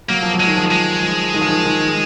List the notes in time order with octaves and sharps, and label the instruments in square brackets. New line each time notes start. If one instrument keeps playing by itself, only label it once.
[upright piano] F#3 [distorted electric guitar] A#3
[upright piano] F3
F#3
[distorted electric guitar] G#3
[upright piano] D#3
F3
[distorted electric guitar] G#3
[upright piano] F3
D#3
F3
D#3
D#3